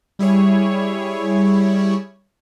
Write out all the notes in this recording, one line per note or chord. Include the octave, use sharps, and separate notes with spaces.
G3 E4 G#4 C#5